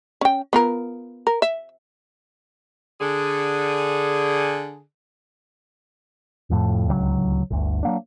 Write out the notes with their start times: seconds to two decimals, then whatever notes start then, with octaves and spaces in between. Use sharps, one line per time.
0.21 C#4 G5
0.53 B3 F4 A#4
1.27 A#4
1.42 E5
3.01 D3 G#4
6.50 F1 F2 A2
6.87 D1 C#2 D3 F#3
7.50 G1 D2
7.83 F#3 A#3 D4